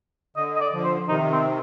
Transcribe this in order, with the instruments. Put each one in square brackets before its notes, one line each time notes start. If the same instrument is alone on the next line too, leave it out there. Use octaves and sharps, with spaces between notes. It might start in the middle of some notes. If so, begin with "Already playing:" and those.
[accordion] D3 [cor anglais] D#5
[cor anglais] D#5
D5
[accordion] D3 F3
[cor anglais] C5
[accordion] C3 D#3 [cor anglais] D#4
[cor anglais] C4